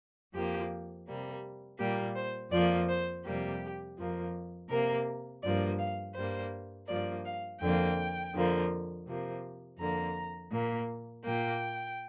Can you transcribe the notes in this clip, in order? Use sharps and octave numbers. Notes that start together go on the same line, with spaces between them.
F2 F3 A#3 G4
C3 G3 A#3
A#2 G3 A#3 G4
C5
F2 F3 A#3 D5
C5
F2 C3 G3 A#3 G4
F2 F3 A#3
C3 A#3 A#4
G2 F3 A#3 D5
F5
G2 G3 A#3 C5
G2 F3 A#3 D5
F5
F2 D3 A#3 G5
F2 D3 F3 A#3
C3 F3 A#3
F2 D3 A#3 A#5
A#2 A#3
A#2 A#3 G5